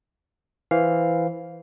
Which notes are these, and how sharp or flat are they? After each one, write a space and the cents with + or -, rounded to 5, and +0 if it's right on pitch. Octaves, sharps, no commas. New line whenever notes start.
E3 +0 C5 +0 F5 +0